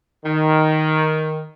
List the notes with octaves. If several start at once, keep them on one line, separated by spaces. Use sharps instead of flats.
D#3